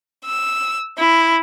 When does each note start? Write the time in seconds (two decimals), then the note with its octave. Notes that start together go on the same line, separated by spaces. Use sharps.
0.24 E6
0.97 E4